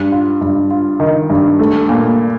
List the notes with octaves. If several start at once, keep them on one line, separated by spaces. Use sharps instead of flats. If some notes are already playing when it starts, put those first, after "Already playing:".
Already playing: G2
F4
G2
F4
D#3
G2
A3
A#2